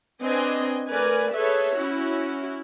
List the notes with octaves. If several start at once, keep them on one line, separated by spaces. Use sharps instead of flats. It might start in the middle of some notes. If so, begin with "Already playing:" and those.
C4 D4 B4 D#5 G#5
A3 A#4 B4 D5 G#5
G#4 A4 B4 C#5 E5
C#4 E4 F#4